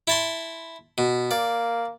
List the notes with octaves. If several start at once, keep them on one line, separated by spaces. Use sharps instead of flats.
E4 A5 C6
B2
A#3 D5